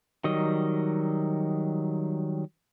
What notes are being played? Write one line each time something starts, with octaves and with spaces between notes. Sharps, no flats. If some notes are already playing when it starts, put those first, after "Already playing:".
D#3 F#3 G3 D#5